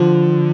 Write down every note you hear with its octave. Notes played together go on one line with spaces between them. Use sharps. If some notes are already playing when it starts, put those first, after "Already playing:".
Already playing: D3 F3